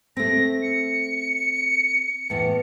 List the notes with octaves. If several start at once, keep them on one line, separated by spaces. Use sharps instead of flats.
A3 C4 A#6
C#7
E2 A2